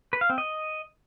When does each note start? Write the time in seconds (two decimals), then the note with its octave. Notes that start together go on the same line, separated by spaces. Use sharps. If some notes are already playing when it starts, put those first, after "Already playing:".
0.13 B4
0.21 F5
0.30 C4
0.38 D#5